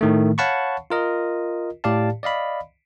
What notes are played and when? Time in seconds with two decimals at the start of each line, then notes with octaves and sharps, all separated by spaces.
0.01 A2 D#3 A3
0.38 C#5 F5 F#5 A5 B5 C#6
0.90 F4 A#4 D#5
1.84 A2 G4 D5 F5 A5
2.23 D5 D#5 F5 B5